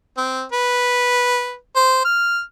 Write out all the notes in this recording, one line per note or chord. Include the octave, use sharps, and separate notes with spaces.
C4
B4
C5
F6